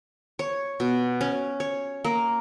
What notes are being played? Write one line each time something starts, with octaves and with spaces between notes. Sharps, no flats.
C#5
B2
C#4
C#5
A#3